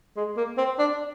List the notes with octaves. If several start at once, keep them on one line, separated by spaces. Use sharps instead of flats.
G#3
A#3
C4
D4